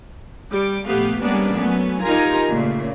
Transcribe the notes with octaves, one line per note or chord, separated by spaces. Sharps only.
G3 D6
A#1 A3 B3 G4 F5
G3 G#3 A#3 B3 C#4 D4
F#3 A3 B3 C#4
D#4 F4 G4 A#4 G#5 A#5
A#2 C#3 A3